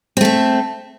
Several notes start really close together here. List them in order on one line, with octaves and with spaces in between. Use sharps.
C4 A3 A4